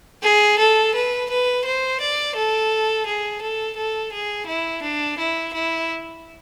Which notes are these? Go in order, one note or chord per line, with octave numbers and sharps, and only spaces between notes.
G#4
A4
B4
B4
C5
D5
A4
G#4
A4
A4
G#4
E4
D4
E4
E4